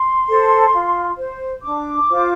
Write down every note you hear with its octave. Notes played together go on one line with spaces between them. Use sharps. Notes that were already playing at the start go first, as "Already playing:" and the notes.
Already playing: C6
A4 C5
F4
C5
D4 D6
F4 C5